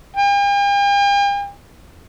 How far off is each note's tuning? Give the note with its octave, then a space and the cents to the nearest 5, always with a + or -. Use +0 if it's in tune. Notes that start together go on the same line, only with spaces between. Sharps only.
G5 +45